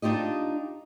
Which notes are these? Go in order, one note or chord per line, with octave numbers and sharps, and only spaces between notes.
D4 D#4 F4 G4 D#5